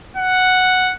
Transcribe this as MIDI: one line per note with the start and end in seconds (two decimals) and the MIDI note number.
0.17 0.92 78